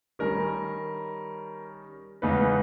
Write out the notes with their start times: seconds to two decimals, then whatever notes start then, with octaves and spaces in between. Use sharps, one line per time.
0.19 D#3 G3 C#4 A#4
2.22 E2 C#3 G#3 D#4 B4